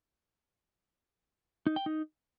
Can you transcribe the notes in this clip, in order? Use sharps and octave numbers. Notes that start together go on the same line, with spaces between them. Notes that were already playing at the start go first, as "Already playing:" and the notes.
D#4
G5
D#4